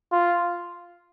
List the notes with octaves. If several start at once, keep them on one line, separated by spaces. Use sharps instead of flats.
F4